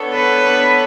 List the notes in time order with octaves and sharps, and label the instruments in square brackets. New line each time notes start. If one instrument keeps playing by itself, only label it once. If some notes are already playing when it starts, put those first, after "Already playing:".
Already playing: [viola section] B3 D4 A4 C#5
[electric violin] B4